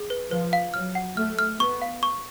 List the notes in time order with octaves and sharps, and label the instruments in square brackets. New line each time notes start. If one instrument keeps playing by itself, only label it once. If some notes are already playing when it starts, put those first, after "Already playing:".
Already playing: [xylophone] G#4
B4
[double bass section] F3 [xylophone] B4
[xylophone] F5
[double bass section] F#3 [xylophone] F6
[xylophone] F#5
[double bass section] A3 [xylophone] F6
[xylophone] F6
[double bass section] B3 [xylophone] C#6
[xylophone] F5
C#6